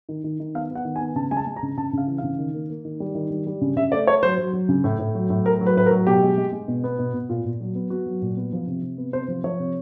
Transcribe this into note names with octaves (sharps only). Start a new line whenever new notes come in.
D#3
D#3
D#3
B3 F5
B3 F#5
D#3
G#5
B3
C#3 A5
G#3 G#5
A5
G#3
A#5
C#3
C#3 A5
C#3 F5
E3
F5
C#3
D#3
A#3
A#3
D#3
G3
D#3
G3
G3
C#3
C#3 E5
A3 D5
A3 C#5
F#3 C5
F#3
F#3
C#3
A2
A2
F#3
A2
A3 A#4
F#3
B4
A2 B4
A#4
F#3
B2 G4
G#3
G#3
G#3
B2
B3
B2
B2
A#2 F4
A#2
F#3
B3
B3 F#4
F#3
A#2
B3
F3
C3
C3
B3
C3 C5
F3
F3 C#5
C3